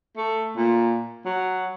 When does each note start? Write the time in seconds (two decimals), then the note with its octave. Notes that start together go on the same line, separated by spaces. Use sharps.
0.17 A3
0.57 A#2
1.26 F#3